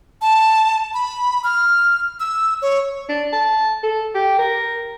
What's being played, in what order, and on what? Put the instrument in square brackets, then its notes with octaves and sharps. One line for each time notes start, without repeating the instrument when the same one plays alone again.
[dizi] A5
B5
F6
E6
C#5
[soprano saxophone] D4
A5
A4
G4
A#4